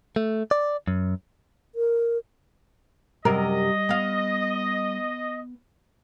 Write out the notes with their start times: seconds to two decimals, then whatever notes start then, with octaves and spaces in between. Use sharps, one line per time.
0.16 A3
0.51 D5
0.88 F#2
1.75 A#4
3.25 F#2 C3 G3 A#4 D#5
3.89 B3 F5